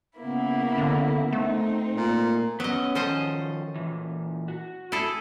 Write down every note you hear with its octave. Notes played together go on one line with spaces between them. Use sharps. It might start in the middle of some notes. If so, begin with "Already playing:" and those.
C#3 A#3 B3 E4
D3
A3 C4 D#4
A#2
F#3 B3 C#4 D#5
D#3 F3 C#4 A4 C5 D#5
A#2 E3
F#4
E4 G#4 A4